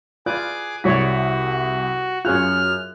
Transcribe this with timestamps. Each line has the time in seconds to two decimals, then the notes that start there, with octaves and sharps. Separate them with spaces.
0.26 F4 G#4 B4 D5 D6 F#6
0.84 C2 E4 F#4 C#5 D5 B6
2.25 F#2 F4 G#4 C#5 F6 F#6